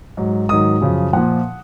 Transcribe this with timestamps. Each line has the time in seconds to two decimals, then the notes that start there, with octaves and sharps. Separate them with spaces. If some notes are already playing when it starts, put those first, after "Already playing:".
0.17 G#2 F#3
0.49 G#2 D#3 F#3 D#6
0.81 F#2 C#3 F3
1.13 A#2 F3 F#5